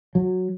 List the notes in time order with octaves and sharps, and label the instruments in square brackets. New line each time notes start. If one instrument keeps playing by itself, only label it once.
[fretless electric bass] F#3